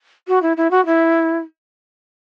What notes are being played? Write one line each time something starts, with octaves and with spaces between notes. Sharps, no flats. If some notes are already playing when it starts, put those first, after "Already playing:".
F#4
E4
E4
F#4
E4